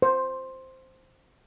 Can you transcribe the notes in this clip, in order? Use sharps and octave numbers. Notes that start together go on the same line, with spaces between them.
C5